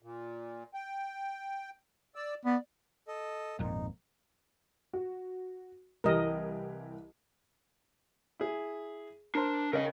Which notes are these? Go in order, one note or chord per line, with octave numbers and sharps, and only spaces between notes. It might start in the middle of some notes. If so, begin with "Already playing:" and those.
A#2
G5
D5 E6
B3 D5
A4 D#5
G#1 F2 A#2 D#4
F#4
C2 E3 G4 A#4 D#5
E4 G#4
D4 A#4 C5
C#3 C#4 A#4 D#5